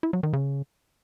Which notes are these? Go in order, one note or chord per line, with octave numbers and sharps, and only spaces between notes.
E4
F#3
D#3
C#3